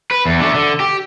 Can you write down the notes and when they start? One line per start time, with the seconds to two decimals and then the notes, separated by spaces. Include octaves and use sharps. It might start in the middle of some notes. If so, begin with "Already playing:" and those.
0.11 B4
0.26 E2
0.40 D3 A3
0.55 D3
0.80 G4